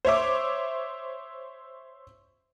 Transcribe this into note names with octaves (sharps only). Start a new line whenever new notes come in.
C5 C#5 E5 D6